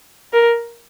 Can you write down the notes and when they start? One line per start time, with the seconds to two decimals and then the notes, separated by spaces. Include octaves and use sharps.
0.33 A#4